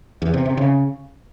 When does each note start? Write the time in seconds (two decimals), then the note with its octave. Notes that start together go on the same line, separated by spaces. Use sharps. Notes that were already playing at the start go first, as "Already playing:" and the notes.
0.22 E2
0.34 C3
0.45 C3
0.57 C#3